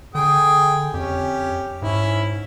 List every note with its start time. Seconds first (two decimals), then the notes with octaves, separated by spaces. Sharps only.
0.15 D3 G#4 G5 D#6
0.94 F2 C#4 G4
1.82 G#2 C#4 E4